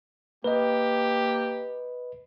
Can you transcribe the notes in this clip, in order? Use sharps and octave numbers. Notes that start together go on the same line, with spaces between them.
A#3 G4 B4 D#5